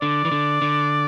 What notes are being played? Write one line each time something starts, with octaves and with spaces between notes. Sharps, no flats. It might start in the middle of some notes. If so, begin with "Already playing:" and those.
D3 D5
E3
D3
D3